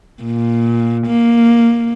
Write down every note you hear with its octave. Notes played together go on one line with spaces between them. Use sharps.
A#2
A#3